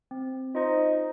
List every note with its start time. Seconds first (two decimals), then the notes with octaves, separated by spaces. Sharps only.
0.11 C4
0.55 D#4 F4 C5 D#5